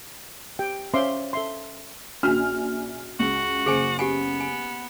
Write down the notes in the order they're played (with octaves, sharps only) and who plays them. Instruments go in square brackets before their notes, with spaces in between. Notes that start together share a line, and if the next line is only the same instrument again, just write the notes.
[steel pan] G4 G5
C#4 C5 E5 F5 C6 D6
A4 E5 C6
[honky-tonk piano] A#1 G#5 F6 [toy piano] C#4 D4 F#4
[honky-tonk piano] C#2 [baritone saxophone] F#4
[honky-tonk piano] F#1 C#3 C#7 [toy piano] G#4 C5 G#5
[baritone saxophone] B3 [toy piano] G4 F#5 G#5
[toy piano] G#5